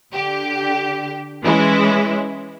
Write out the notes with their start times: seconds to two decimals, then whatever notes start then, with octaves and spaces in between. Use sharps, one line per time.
0.14 D3 G4
1.43 E3 G#3 C#4 E4